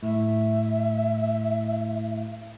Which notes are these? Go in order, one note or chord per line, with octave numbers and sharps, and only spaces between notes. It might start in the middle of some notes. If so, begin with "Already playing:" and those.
A2 E5